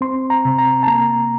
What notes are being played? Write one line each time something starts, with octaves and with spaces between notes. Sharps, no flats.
C4 C6
A#5
C3
A#5
A5
A#3 A#5